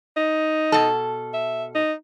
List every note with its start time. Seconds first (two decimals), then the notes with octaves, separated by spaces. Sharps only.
0.17 D#4
0.72 B2 A4
1.34 E5
1.75 D#4